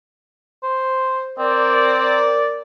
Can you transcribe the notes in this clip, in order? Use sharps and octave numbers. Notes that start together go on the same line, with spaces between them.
C5
C4 A#4 D5